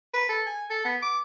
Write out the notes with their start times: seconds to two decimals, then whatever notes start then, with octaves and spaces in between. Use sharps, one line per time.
0.14 B4
0.29 A4
0.46 G#5
0.70 A4
0.85 B3
1.02 D6